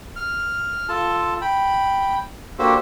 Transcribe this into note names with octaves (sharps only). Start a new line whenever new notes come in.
F6
F4 A4 A5
G5 B5
A#3 D4 F#4 G4 A4 C5